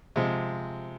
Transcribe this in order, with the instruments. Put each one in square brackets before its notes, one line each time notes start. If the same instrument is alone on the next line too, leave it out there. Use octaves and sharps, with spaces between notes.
[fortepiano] C3 F3 G#3